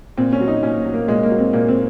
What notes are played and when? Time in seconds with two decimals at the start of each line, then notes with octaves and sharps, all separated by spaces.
0.18 A#2 C4
0.33 C#4
0.40 F#3
0.48 D#4
0.63 A#2 C#4
0.85 F#3
0.94 A#3
1.08 A#2 G#3
1.23 A#3
1.31 F#3
1.38 C4
1.53 A#2 A#3
1.68 C4